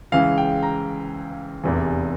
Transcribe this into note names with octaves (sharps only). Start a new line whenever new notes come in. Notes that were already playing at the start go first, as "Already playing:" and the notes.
C#2 C#3 E3 G#3 F5
G5
A#5
F1 E2 C3 E3